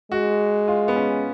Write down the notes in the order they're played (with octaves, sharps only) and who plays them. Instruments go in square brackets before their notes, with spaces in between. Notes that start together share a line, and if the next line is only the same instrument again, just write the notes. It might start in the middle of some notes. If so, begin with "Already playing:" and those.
[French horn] G#3 [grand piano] F#4
[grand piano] F4
B3
C#4